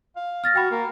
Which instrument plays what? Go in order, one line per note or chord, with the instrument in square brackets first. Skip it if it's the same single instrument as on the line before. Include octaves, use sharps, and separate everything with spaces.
[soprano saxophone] F5
[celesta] F6 A6 A#6
[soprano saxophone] F#4 [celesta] G5 B5
[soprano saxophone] A#3